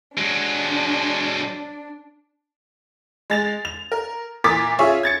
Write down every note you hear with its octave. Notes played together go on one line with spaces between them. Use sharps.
F#3 G#3 D4
G#3 A6 F7
F7
A#4
A#2 E3 A#4 D6 A6 B6
C#4 F4 G#4 C#5 E5
G#6 A6 C#7